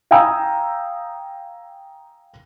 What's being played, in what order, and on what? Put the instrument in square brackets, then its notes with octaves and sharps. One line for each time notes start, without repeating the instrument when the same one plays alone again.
[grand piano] F5 G5 G#5 A#5 D#6 E6